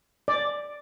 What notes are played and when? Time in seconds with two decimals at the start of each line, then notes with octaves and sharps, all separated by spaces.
0.28 D5